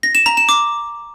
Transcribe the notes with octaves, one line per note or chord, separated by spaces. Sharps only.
A#6
E7
A#5
E7
D6